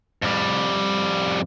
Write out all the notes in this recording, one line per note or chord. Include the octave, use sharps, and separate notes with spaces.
F2 G3